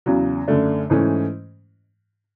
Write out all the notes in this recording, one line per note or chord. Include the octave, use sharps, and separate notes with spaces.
E2 C#3 F#3
F#2 D3 A3 D4
G#2 E3 A3 C#4